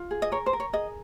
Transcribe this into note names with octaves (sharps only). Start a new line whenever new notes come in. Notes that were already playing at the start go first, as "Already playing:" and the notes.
Already playing: F4
G#4
D#5
A#4 C#5
C5
A#4
C#5
G#4 D#5